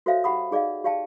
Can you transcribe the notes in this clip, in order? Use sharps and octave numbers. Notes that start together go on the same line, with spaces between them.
F#4 A4 C5 C#5 E5 F5
G4 F#5 B5 D#6
D#4 G#4 D5 D#5 F5
G4 D5 F5 G5 A5